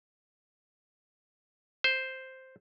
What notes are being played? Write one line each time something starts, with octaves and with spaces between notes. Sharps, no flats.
C5